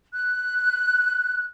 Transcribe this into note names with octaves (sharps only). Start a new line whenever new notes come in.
F#6